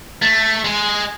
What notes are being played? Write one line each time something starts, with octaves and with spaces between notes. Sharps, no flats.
A3
G#3